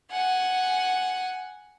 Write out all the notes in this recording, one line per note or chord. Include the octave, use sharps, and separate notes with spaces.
F#5 G#5